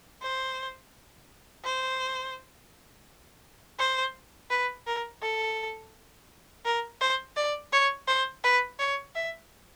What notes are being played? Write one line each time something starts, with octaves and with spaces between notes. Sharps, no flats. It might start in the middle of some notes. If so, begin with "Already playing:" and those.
C5
C5
C5
B4
A#4
A4
A#4
C5
D5
C#5
C5
B4
C#5
E5